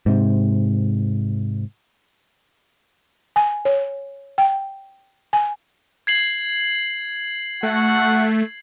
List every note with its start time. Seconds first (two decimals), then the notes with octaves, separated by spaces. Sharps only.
0.06 G#2 C3
3.36 G#5
3.65 C#5
4.38 G5
5.33 G#5
6.07 G#6 C7 F#7
7.63 A3 F#4 F#5